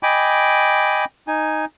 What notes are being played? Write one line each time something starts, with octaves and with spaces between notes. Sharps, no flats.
D#5 G5 G#5 B5 D6
D#4 G#5